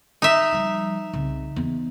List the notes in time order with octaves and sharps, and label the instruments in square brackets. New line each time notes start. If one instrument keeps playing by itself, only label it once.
[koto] D#4 E5
[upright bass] F3 G3
C2 C#3
E2